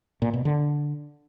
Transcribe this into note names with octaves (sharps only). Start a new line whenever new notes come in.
A#2
B2
D3